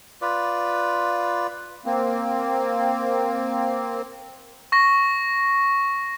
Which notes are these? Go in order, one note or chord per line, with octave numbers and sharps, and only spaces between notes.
F4 B4 D5
A#3 C4
C#6 A#6